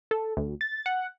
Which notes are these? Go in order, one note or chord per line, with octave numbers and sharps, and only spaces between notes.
A4
D2
A6
F#5